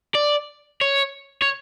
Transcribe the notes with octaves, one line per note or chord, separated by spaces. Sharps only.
D5
C#5
C#5